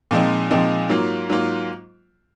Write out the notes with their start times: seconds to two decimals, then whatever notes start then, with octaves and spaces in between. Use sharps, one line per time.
0.11 A#2 F3 G#3 C4 D#4
0.51 A#2 F3 G#3 C4 D#4
0.89 G#2 F#3 A#3 F4
1.29 G#2 F#3 A#3 F4